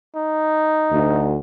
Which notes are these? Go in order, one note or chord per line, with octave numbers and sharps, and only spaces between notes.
D#4
D2